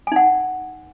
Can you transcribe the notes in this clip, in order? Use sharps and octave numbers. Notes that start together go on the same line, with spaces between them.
D#4 F#5 G#5